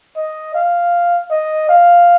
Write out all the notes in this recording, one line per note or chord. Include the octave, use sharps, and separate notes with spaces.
D#5
F5
D#5
F5